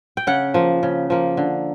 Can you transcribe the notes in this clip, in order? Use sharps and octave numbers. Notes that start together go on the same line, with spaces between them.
G5
C#3 F#5
F3 A#3
C#3
F3 A#3
D3